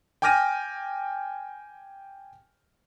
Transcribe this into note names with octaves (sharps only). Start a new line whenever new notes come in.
G5 G#5 D6 F6 A#6 D#7